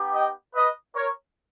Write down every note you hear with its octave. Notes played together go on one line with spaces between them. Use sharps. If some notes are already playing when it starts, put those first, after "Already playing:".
Already playing: B3 D#4 G4
D#5 G5
B4 D#5
A#4 C#5